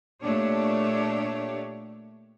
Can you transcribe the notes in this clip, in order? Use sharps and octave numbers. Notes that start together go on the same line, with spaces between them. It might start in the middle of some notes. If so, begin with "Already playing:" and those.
A#2 A3 D4 G4 C#5